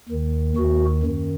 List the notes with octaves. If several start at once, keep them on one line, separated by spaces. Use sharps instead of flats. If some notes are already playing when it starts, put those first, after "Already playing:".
D#2 D#3
D#2 D#3 F#4
F#2 D#3